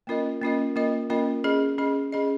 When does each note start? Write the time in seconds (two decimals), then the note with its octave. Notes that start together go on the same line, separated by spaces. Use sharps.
0.07 A#3 C#4 F4 A#4 D#5
0.42 A#3 C#4 F4 A#4 D#5
0.76 A#3 C#4 F4 A#4 D#5
1.10 A#3 C#4 F4 A#4 D#5
1.44 C#4 G#4 D#5
1.78 C#4 G#4 D#5
2.12 C#4 G#4 D#5